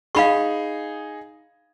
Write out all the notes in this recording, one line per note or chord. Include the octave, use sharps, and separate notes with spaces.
D#4 G#4 F5 B5 C#6